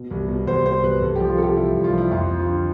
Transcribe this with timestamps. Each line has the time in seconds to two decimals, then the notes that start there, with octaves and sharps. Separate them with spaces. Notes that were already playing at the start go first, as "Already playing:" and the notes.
Already playing: B2
0.11 C2
0.28 B2
0.47 C2 C5
0.66 B2 C5
0.83 C2 B4
1.01 C2 A4
1.16 F3 G4
1.29 F4
1.38 C3 G4 A4
1.57 C2 E4
1.75 C2
1.84 F4
1.93 F3 E4
2.11 F2 F4
2.30 F3
2.39 F4
2.49 D3